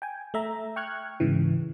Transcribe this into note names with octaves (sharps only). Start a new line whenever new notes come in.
G5 G#5
A3 E5 A#5
G5 C#6 F6 F#6 G#6
G#2 C#3 E3